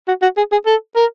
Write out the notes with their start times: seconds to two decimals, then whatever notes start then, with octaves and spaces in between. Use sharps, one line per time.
0.08 F#4
0.22 F#4
0.37 G#4
0.52 G#4
0.66 A4
0.96 A#4